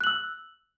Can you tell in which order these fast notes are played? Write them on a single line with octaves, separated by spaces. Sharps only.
F#6 F#7 E6